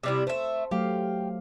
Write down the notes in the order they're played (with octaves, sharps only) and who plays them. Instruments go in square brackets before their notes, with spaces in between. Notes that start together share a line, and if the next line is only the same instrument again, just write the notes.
[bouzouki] C3 G3 E4
[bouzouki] A3 E5 [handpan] C5
[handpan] F#3 A3 F5 [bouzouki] G4